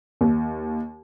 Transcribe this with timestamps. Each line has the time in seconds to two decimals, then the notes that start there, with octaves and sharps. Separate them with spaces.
0.21 D#2